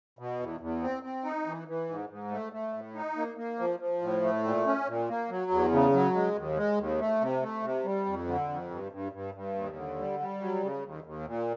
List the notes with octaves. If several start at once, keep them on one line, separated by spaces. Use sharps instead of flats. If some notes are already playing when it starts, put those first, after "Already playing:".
B2
E2
E2
C4
C4
D#4
E3
E3
G#2
G#2
A3
A3
A2
D#4
A#3
A#3
F3
F3
A2
A3
A#2
C#4
A#2
A#3
F#3
E2
C#3
F#3
G#3
D#2
G#3
D#2
A3
C3
A3
C3
G3
F2
D3
F2
G2
G2
G2
G2
D#2
D3
G3
G3
F#3
C#3
D#2
D#2
A#2